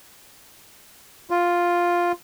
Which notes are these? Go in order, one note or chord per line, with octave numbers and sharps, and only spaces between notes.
F4